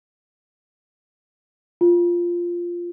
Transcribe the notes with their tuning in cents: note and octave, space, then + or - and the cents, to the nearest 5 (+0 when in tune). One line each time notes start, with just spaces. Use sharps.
F4 -5